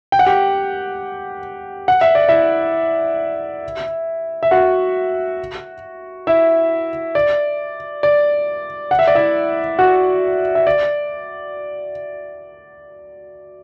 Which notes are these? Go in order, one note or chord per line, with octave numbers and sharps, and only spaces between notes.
G5
F#5
G4 G5
F#5
E5
D5
E4 E5
E5
F#4 F#5
E4 E5
D5
D5
F#5
E5
D5
E4 E5
F#4 F#5
E5
D5